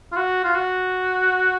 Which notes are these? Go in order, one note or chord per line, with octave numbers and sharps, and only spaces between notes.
F4
F#4
F4
F#4